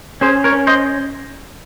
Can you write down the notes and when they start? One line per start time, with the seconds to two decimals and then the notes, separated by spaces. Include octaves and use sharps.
0.21 C#4 G#4 C5
0.44 A#4 C#5
0.52 C#4
0.67 C5 D#5